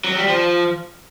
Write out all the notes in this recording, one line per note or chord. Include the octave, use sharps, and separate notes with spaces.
F#3
G3
F3